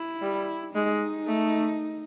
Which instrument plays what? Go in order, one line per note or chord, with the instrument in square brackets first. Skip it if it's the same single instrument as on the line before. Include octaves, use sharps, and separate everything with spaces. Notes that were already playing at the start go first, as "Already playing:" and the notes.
Already playing: [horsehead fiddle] E4
[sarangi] G3
[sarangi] G#3 [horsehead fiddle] D#4
[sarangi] A3